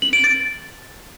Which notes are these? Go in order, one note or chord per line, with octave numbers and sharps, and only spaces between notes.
F#7
D7
A6